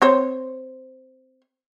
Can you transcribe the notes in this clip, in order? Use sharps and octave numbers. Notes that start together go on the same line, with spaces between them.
C4 C5 C#5